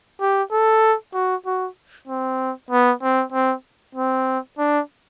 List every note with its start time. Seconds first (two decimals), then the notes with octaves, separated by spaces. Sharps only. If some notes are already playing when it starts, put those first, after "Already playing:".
0.21 G4
0.51 A4
1.14 F#4
1.46 F#4
2.08 C4
2.70 B3
3.02 C4
3.32 C4
3.95 C4
4.58 D4